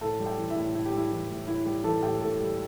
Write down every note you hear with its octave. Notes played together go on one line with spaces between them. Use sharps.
A2 A4 A5
G3
G4 G5
E3
E4 E5
A2
A2 E4
G4
G3 E4
E3
A2
A2 E4
G3 G4
E3 A4 A5
A2 G4 G5
A2 A4 A5
G3